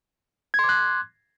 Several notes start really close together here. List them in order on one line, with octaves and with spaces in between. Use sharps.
G#6 C6 D6 F#6